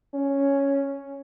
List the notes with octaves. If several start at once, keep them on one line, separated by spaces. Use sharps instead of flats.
C#4